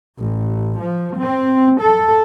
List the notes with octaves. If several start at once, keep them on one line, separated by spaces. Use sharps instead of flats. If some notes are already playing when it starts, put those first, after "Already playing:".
A1
F3
C4
A4